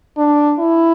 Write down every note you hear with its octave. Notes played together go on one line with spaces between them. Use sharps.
D4
E4